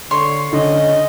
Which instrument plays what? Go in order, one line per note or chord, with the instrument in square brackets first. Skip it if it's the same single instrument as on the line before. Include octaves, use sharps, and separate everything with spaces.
[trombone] D3 [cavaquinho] C#5 C6
[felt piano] D3 [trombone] C#4 [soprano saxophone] D#5